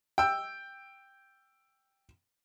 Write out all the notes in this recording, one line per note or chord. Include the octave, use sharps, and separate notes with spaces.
G5 E6